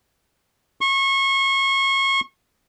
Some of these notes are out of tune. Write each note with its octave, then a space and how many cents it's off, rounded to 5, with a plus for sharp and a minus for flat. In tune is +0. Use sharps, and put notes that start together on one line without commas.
C#6 -30